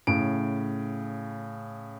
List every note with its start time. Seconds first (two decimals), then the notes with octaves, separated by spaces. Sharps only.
0.07 A2 C#3 D7